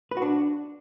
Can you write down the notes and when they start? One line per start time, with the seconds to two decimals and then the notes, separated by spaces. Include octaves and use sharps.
0.11 B4
0.17 F#4
0.22 D4